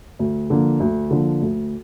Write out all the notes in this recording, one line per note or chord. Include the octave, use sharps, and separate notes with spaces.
D2
D3 F3 A#3
D2
D3 F3 A#3
D2